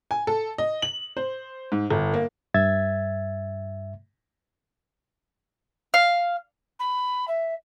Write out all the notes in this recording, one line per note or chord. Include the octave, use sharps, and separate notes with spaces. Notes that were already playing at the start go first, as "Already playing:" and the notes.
G#5
A4
D#5
F#7
C5
G#2
G1
A#3
G2 E5 G#6 A6
F5
B5
E5